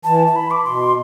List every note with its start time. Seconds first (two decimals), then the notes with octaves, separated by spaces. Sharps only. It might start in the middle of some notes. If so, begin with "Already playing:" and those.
0.04 E3 A5
0.27 A5
0.36 B5
0.51 D6
0.65 B2 C6